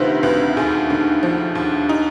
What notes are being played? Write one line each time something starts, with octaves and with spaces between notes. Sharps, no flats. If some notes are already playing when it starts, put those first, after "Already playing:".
Already playing: D2 C3 D#3 F4 B4 C5
D2 B4
D#2 G#4
D3
F3
D#2
D#4